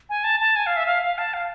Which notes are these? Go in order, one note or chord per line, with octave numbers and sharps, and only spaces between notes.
G#5
A5
A5
G#5
F5
E5
F5
F5
A5
F5